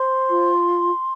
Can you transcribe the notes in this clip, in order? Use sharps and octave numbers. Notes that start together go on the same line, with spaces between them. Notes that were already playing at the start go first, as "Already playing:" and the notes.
Already playing: C5 C6
F4